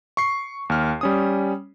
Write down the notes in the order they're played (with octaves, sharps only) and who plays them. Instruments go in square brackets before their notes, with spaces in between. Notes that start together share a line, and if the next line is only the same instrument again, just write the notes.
[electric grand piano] C#6 C7
D#2 F6
G3 C#4 D#6